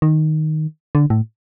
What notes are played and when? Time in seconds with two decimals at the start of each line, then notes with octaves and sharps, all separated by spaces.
0.02 D#3
0.95 D3
1.10 A2